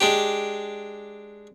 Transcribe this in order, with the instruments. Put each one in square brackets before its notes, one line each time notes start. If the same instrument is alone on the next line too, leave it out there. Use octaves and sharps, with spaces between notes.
[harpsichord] G#3 D4 G4